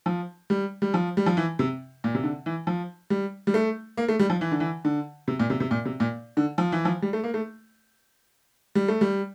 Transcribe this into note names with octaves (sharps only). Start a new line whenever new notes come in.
F3
G3
G3
F3
G3
F3
E3
C3
A#2
C3
D3
E3
F3
G3
G3
A3
A#3
A3
G3
F3
E3
D3
E3
D3
C3
A#2
C3
C3
A#2
C3
A#2
D3
F3
E3
F3
G3
A3
A#3
A3
G3
A3
G3